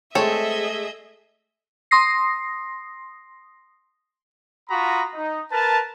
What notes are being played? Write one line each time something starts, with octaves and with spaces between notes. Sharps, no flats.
G#3 A3 C4 G#4 A4 C#5 D#5 E5
C6 D#6 A#6 C7
F4 F#4 A#5 B5 D#6
D#4
A#4 B4 A5